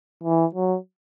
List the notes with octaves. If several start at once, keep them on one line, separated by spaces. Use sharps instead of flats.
E3
F#3